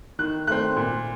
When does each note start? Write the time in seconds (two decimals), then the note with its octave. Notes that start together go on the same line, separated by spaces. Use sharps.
0.19 D#3 F#6
0.47 A3 C4 F#6
0.76 A#2